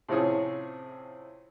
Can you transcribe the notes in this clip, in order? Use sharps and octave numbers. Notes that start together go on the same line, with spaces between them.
A2 C3 F3 C4 C#4 G#4